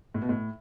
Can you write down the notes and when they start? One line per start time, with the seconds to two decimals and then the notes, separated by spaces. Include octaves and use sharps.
0.14 A2
0.22 B2
0.29 A2